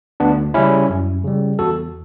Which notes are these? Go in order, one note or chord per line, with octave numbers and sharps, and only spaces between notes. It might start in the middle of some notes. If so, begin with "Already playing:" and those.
D2 B3 D4
C#3 G3 C#4 E4
F#2
C#3 G3
E2 F#4 A4